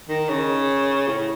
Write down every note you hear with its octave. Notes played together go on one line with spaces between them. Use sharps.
D#3
C#3
A2